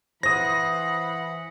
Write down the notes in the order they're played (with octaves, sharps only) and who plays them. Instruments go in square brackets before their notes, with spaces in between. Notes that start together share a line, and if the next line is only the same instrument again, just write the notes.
[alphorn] E3 [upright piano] C5 D#6 [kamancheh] F#5 B5 [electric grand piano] A#6